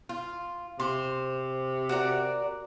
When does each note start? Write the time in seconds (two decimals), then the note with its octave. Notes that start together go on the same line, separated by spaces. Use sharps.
0.09 F4
0.80 C3 C5
1.89 F#4 A#4 D5